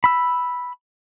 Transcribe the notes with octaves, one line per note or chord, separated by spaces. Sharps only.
B5 E6